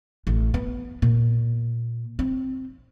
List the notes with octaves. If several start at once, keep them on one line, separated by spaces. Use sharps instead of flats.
A1
B3
A#2
C4